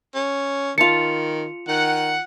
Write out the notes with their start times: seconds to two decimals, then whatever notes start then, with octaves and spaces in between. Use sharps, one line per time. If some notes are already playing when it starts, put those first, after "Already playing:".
0.15 C#4
0.78 D#3 F4 A5 C#7 F7
1.68 D#3 F#5